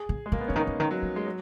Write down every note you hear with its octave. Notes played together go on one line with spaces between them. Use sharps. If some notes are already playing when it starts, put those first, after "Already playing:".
Already playing: G#4
C#3
G#3
C#3 A#3
B3
C#3 C#4
D#3 D#4
C#3
D#3
F#3
F3
G#3
F#3